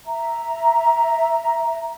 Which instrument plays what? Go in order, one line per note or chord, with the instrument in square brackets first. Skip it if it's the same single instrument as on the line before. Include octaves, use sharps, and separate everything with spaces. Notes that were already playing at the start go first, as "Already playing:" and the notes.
[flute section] E5 A#5